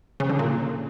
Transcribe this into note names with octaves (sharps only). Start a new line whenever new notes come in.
C#3
D3
A#2